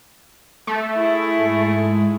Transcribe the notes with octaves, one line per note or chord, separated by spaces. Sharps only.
A3
E4 G#4
G#2 G#3